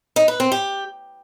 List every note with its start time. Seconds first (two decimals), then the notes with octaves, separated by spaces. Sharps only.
0.16 D#4
0.28 B4
0.40 C4
0.52 G4